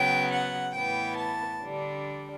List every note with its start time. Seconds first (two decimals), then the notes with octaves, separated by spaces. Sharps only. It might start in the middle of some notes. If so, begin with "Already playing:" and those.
Already playing: C#3 F#3 B3 G5
0.31 F#5
0.74 A2 E3 B3 G5
1.17 A5
1.61 D3 G3 D4